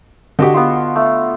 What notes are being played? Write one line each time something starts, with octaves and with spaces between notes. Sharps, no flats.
D3 F#4 G4 D#5
B3 F4
A3